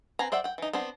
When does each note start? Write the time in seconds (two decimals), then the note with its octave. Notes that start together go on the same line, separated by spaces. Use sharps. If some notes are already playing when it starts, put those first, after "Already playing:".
0.19 C4 B4 G#5 A#5
0.32 C5 D5 E5 F#5 G5
0.44 F#5 G5
0.58 E3 D#4
0.73 B3 C4 D4 C5